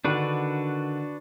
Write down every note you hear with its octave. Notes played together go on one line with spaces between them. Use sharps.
D3 D#3 D4 F#4 B4